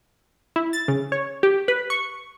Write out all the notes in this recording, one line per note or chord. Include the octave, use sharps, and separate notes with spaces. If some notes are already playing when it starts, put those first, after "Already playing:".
E4
A6
C#3
C#5
G4
B4
C#6